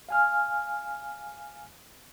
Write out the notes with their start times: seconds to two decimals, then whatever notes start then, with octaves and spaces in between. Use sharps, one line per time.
0.09 F5 G#5 F6